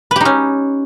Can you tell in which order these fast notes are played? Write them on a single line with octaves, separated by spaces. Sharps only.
B4 G4 D#4 C#4